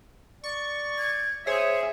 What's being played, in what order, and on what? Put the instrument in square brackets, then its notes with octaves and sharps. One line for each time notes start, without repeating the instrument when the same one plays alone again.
[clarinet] D5 [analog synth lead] C#6
[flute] G#6
[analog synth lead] G#4 [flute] C5 [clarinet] C#5 [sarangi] E5